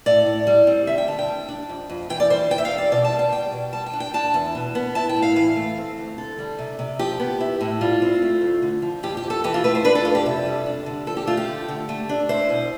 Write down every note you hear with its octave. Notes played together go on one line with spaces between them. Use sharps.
A2 D5
A2
G3
C4
D3 E5
G5
D3 A5
G5
G3
D4
F2
F2
E3 G5
D5
G3 C5
E2 G5
E5
F5
E2
D5
B2 D5
A5
G3
G5
B2 G5
B2
G3 A5
G5
D4
G5
D4 A5
E2
B2
B3
E4 A5
G5
A2
F5
E3 F5
A3
C4
D2
D3 A4
G3
C3
C3
F3 G4
B3
E4
A2
G3 F4
C4
A3
D2
D3
F3
F2 G4
G4
F2
A4
E3 G4
F4
A3 B4
C5
D4 B4
A4
F2 F4
G4
C3 A4
G3
D4
D3
F3 A4
G4
A3 F4
G4
D3
D3
A3
D4
E4 C5
B2